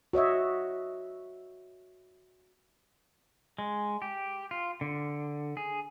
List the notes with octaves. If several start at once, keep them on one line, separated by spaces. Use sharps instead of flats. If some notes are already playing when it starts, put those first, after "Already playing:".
F#4 C#5 D#5 E5
G#3
G4
F4
D3
G#4